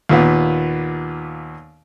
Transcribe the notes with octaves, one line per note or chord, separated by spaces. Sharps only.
D#2 A#2 B3